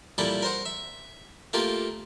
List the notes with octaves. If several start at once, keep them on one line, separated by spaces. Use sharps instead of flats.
A#2 G3 E4 A4 D5 G5
A#4 C5 F#5
E5
A3 A#3 F4 G4